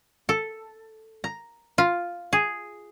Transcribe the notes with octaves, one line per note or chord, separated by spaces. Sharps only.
A4
A#5
F4
G#4